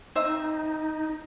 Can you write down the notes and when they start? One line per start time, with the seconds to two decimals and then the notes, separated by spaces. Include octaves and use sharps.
0.16 C4 D#4 D#5 E5